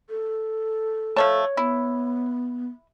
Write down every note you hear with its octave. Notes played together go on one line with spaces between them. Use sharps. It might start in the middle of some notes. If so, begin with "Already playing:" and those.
A4
F3 A3 C#5 A5
B3 E4